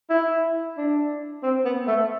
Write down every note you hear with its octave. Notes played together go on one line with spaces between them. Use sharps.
E4
D4
C4
B3
A3